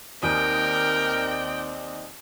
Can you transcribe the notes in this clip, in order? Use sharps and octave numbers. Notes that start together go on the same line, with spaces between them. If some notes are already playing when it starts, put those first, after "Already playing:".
D#2 C4 A#4 D5 D#5 G5 G#5 D#6